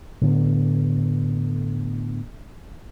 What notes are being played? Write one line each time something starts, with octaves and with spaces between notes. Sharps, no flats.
A2 D3 B3